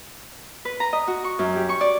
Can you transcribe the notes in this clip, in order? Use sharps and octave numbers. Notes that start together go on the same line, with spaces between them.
B4
A#5
D#5
F#4
C#6
F#2
G4
C#6
D5